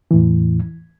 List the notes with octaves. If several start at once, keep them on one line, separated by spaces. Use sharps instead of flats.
E2 A2 E3